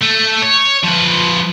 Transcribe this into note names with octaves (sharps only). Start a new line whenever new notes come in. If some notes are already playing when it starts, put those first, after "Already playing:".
A3
C#5
F3 B4